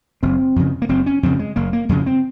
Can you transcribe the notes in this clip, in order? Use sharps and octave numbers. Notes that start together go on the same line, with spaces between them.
F#1 C4
F2 C#3
A#3
F#1 C4
C#4
F2 C#3 C4
G#3
F#1 A#3
A#3
F2 C#3 G#3
C4